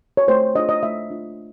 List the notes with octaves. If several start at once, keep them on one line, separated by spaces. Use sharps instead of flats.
C#5
A3 C5
D4 F4 D#5
D#5
A3 E5
D4 F4